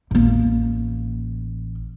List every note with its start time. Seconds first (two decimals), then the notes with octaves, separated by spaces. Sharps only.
0.11 A1 A#3